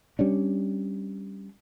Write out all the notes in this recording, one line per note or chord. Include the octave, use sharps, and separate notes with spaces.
G3 C#4 D4